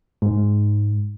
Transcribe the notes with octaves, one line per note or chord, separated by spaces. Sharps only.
G#2